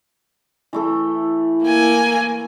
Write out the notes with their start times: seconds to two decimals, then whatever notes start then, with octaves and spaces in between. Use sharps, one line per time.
0.73 E3 A3 A4
1.06 E4
1.65 A#3 G#5